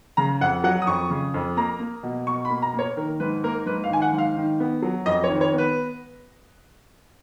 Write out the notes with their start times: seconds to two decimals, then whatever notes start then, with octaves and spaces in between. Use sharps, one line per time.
0.17 C#3 A#5
0.41 F2 F#5
0.64 F#3 F#5
0.82 D#6
0.87 F2 C#6
1.10 C#3
1.34 F2
1.57 A#3 A#5
1.80 A#3
2.03 B2
2.27 B2 C#6
2.45 B5
2.50 A#3
2.62 A#5
2.73 A#3
2.79 C#5
2.97 D#3 A#4
3.20 G#2 B4
3.44 A#3 A#4
3.66 G#2 B4
3.84 F5
3.90 D#3 G#5
4.02 F#5
4.13 G#2
4.18 F5
4.37 D#3
4.60 B3
4.82 F#3
5.06 F2 D#5
5.24 C#5
5.29 D#3
5.41 C#5
5.53 B3 B4